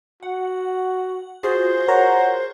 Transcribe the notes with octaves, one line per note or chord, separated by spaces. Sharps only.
F#4 F#5
F4 F#4 G#4 C5
A#4 C#5 F#5 A#5